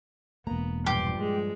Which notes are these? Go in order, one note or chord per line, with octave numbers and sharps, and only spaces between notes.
E1 A#3 B3 A#5
G2 A#2 F3 G4 C6
G#3